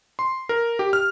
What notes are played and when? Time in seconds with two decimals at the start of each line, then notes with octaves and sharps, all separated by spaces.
0.19 C6
0.49 A#4
0.79 G4
0.93 F6